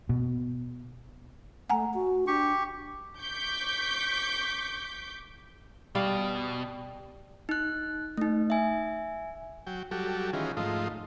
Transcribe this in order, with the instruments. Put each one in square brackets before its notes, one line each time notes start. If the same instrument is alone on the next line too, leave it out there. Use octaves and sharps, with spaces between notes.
[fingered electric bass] B2
[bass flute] A3 [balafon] F#5 G#5 A#5
[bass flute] F#4
[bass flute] D4 [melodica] G4 C#6
[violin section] C#6 D6 G6 B6
[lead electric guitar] B2 [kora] G3 D5 F5
[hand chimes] D#4 F#6
A3 D#4
E5 G#5
[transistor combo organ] F#3 G5
F#3 G3 F#4 G4 A4
D#3 E3 C#4 F4 G#4
G#2 F3 A3 D#4 F4